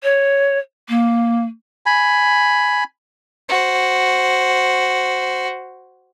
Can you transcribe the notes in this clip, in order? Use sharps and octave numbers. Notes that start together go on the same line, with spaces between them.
C#5
A#3
G#5 B5
F#4 C5